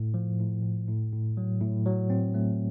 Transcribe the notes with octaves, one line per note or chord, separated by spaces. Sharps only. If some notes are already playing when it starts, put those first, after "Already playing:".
Already playing: A2
F3
A2
A2
A2
A2
F#3
A2
F#3
C4
A3